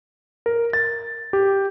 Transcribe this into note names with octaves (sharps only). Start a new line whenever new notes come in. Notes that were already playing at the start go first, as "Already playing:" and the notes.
A#4
A6
G4